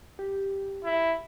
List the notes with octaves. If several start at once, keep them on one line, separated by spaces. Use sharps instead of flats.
G4
E4